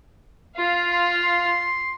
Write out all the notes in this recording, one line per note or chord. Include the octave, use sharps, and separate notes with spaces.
F4 F5
C6